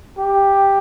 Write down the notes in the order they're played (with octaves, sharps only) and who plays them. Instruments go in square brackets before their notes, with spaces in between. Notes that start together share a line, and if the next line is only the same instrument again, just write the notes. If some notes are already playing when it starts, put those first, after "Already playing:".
[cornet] G4